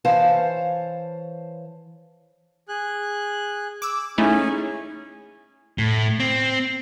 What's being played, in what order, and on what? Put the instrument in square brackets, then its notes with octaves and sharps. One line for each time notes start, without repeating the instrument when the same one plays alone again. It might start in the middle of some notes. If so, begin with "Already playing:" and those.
[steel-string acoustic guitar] E3 C5 C#5 F5 A5
[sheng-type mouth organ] G#4 F#6
[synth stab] D6 E6
[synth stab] A3 D#4 E4 [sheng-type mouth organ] C#4 G#4
[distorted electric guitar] A2
C4